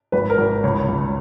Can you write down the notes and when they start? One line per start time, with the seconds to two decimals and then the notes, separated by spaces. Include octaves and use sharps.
0.12 G#1 B4
0.30 A#4
0.38 G#1
0.46 A#4
0.63 C#2 C#5
0.88 C#2